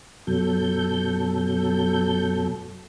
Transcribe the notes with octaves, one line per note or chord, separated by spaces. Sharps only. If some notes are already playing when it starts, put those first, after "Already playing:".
F#2 B2 F#3 A4 G6